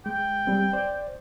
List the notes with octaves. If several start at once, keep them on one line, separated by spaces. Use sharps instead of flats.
G#3 G5
G3 C4
C5 D5